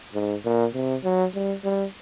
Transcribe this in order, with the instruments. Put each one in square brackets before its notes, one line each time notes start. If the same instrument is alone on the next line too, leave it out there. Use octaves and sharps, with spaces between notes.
[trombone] G#2
A#2
C3
F#3
G3
G3